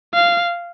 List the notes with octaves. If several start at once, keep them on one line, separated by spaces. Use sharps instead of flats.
F5